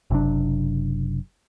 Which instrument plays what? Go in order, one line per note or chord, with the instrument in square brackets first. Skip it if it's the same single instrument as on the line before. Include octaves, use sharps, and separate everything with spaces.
[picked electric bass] F#1 C3 F#3 D4